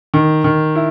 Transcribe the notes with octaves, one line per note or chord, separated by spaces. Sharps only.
D#3
D#3
E4